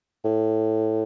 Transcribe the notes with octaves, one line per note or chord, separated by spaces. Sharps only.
A2